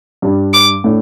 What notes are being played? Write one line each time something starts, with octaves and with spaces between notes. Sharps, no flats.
G2 G3 D4
D6
A2 A3 D4